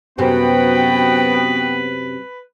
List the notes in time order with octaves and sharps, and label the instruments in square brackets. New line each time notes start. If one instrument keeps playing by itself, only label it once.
[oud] F#2 C3 [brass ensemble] B3 [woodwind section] F#4 G5 [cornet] B4